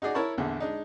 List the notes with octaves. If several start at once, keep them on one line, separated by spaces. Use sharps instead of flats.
D#4 F#4 G#4 D5
E4 A#4 C#5 A5 B5 C#6
A#1 E2 D3
G#3 D4 D#4